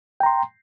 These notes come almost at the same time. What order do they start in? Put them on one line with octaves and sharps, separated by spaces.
G5 A#5 C6